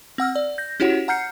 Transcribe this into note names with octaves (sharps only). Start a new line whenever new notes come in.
C4 F#5 E6 F6
D5
G6 A#6
C#4 E4 F#4 G4 C#5 F#5
F#5 A#5 F6 G6 C7 C#7